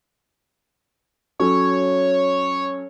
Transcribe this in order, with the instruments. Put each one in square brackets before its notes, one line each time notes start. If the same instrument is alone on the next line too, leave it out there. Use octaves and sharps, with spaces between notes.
[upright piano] F#3 C#4 A4 [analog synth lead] C#5